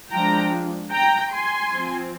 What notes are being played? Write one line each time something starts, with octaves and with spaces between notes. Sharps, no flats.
F3 G#3 D4 G5 A#5
G5 A#5
G#5 C6
F3 C4